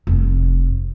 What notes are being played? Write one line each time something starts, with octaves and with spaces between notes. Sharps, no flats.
F1